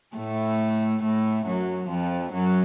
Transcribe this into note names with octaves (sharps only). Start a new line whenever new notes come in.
A2 A3
A2 A3
F#2 F#3
F2 F3
F#2 F#3